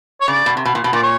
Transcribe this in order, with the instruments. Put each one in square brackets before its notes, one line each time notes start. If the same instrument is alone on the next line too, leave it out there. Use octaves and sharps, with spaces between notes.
[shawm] C#5
[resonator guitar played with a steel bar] C#3 [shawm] D5
[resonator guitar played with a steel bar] B2
C3
B2
A#2
B2
[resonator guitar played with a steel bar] A#2 [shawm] D5
[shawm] C#5